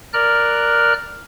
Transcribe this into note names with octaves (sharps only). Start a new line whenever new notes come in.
A#4 D5 F6 F#6